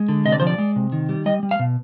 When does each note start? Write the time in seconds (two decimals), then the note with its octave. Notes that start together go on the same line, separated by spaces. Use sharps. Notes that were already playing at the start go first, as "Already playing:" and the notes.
Already playing: G#3
0.09 D3
0.25 C3 D#5
0.32 D5
0.40 F3 C5
0.47 D5
0.58 G#3
0.76 C3
0.92 D#3
1.09 G3
1.26 G3 D#5
1.43 G3
1.51 F5
1.59 B2